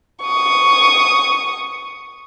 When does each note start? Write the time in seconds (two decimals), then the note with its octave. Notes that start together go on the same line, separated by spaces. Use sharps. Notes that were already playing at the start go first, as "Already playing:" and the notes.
0.23 C#6 D#6